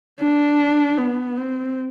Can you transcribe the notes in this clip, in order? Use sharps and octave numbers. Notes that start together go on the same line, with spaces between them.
D4
B3
C4